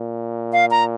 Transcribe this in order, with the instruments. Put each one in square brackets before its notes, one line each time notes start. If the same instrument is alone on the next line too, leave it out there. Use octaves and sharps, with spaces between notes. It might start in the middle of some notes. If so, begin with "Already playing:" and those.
Already playing: [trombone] A#2
[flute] F5
A#5